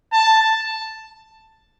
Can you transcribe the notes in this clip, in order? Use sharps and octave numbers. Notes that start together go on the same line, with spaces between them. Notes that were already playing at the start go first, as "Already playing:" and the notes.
A5